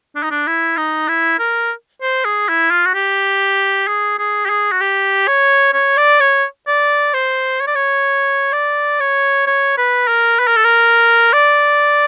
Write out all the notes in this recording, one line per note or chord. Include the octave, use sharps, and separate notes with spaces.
D4
D#4
D4
E4
D#4
E4
A#4
C5
G#4
E4
F4
F#4
G4
G#4
G#4
G4
G#4
F#4
G4
C#5
C#5
D5
C#5
D5
C5
C#5
D5
C#5
D5
C#5
C#5
B4
A#4
B4
A#4
A4
A#4
D5